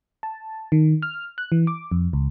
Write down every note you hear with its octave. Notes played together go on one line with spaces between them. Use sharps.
A5
D#3
F6
F#6
E3
D6
F2
C#2